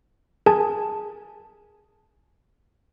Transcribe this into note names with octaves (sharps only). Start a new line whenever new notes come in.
G#4 A#4 G#5 A5